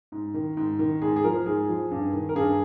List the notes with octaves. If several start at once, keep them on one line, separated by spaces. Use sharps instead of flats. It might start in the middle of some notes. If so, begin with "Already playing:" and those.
G#2
D#3
G#2
D#3
G#2 G#4
G#4
F3 A#4
G#2 G#4
F3
G2
D#3
A#4
G2 G#4